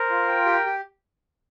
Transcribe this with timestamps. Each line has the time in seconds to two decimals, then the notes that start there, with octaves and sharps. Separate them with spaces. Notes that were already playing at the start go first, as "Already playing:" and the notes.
Already playing: A#4 C5
0.10 F4
0.28 G5
0.46 G4
0.66 G4